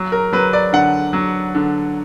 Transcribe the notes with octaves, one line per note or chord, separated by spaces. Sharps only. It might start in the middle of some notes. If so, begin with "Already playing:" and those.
Already playing: F#3
A#4
F#3 B4
D5
D3 F#5
F#3
D3